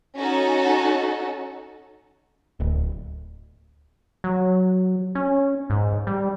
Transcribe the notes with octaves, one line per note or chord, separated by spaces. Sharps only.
C#4 D#4 F#4 A4
D1
F#3
C#4
G#2
G3